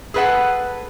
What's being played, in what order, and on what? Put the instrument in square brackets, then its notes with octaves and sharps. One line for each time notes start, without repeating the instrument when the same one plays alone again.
[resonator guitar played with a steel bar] G#4 A4 B4 C#5 F#5 A5